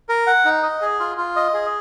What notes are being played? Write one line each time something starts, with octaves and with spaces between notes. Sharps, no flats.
A#4
F#5
D#4
D#5
G#4
F4
F4
D#5
G#4